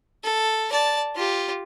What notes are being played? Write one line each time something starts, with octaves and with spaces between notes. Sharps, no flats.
A4
D5 A5
F4 G4